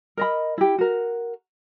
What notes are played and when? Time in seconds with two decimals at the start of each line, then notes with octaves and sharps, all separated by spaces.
0.17 A#4 D#5 B5
0.58 E4 G4
0.78 F#4 A#4